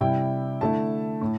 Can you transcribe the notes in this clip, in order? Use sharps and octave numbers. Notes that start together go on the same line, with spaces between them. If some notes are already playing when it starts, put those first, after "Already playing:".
C3 G3 E4 G5
D3 A3 E4 A5
A2